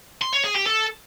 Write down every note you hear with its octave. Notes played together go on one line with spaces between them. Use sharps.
C6
C#5
G#4
G4
A4